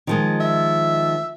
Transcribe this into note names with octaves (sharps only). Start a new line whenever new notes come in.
D#3 F3 G#3
E5